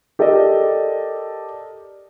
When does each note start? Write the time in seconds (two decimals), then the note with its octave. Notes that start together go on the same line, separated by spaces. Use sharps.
0.19 G4 A4 A#4 D5 D#5